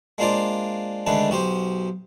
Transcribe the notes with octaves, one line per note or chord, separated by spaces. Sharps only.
G#3 A#3 D4 F4 C5 D5
D3 D#3 G#3 A3 D4 B4
B1 F#4 G4 C5